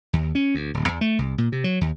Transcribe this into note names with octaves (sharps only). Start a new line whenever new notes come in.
D#2
C#4
D2
D1
E2
A3
C2
A#2
C3
F#3
D#2